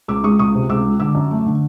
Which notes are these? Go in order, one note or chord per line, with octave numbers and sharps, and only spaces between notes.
C#2 D6 E6
G#3 C#6 D#6
C#2 C#6 D#6
C3
C#2 D6 E6
G#3
D3 D6 E6
F#2
A3
D3